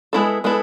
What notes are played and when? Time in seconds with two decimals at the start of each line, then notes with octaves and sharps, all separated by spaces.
0.13 G#3 B3 E4 A4
0.44 G#3 B3 E4 A4